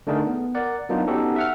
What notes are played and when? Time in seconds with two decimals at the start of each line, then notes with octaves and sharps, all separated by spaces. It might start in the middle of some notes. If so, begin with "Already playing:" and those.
0.07 D3 A3 D4 D#4 G#4 A#4
0.26 B3
0.55 A#4 D5 F#5
0.89 F#3 A#3 B3 D4 D#4 F4
1.08 B3 C#4 D#4 F#4 G4 A4
1.36 E5 F#5 F6